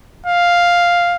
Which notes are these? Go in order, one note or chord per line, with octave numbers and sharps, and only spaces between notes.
F5